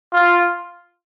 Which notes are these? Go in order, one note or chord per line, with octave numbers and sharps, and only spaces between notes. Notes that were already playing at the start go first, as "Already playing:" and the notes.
F4